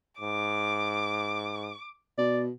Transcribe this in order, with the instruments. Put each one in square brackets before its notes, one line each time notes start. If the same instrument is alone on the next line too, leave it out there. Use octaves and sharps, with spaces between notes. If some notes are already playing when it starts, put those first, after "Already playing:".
[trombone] G#2 [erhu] D6
[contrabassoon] B2 [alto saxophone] D5